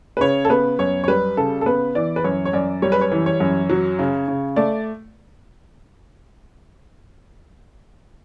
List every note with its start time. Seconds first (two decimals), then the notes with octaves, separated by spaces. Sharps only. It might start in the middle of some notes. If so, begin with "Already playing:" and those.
0.17 B4
0.21 C#3 C#5
0.45 A4
0.50 B3 B4
0.79 F#2 C#5
1.04 C#5
1.08 G3 B4
1.37 C#3 A4
1.61 A4
1.66 B3 B4
1.95 E3 D5
2.16 B4
2.24 F#2 C#5
2.45 C#5
2.53 F#2 D5
2.82 G3 C#5
2.92 B4
3.01 C#5
3.12 E3
3.26 C#5
3.40 F#2
3.69 F#3
3.99 C#3
4.28 C#3
4.56 A3 D5